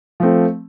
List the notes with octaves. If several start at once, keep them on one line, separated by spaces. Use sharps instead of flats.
F3 A3 C4